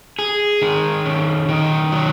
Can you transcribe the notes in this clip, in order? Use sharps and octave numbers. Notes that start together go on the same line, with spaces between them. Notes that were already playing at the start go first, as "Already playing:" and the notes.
G#4
D#3
C#4
D#3
F#3